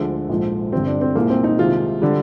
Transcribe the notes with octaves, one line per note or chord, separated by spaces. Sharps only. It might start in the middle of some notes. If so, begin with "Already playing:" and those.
Already playing: D2 D3 F3 G#3
A#1 G#2 F3
G1 G2 D3 G3 C4
D4
C4
C2 A#2 G#3 A#3
C4
D#4
C2 C3 D#3 G#3 F4
D3 G3